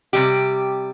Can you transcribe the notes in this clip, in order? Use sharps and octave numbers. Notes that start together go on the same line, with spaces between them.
C3 G3 G4